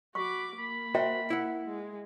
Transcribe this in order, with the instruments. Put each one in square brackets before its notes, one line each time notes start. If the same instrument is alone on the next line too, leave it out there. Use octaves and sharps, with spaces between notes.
[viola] F#4 D6 [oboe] B5 [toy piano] C#6
[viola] A#3 [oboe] B5
[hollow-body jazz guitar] F#4 A#4 C5 [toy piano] E5 G5
[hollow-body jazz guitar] E4 F#5
[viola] G#3